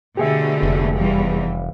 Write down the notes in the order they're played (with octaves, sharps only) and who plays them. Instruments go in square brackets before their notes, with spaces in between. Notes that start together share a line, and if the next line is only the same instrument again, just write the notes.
[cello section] B2 D3 A3 [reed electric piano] G4 G#4 E5
[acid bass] F1
[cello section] E2 E3 G3